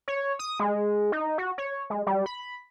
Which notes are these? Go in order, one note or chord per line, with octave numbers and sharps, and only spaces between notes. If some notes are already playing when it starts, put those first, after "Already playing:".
C#5
D#6
G#3
D#4
F#4
C#5
G#3
G3
B5